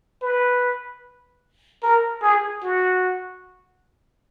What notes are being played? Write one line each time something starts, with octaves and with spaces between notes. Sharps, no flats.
B4
A#4
G#4
F#4